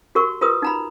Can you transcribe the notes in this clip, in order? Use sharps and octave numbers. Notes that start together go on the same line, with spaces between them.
F#4 G4 A#4 C#6
F4 G4 A#4 B4 D#6
D#4 A#5 B5